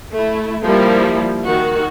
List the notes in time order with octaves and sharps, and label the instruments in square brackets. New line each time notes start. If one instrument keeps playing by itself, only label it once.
[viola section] A3 E4
F3 G3 A#3 E4
D#3 F#4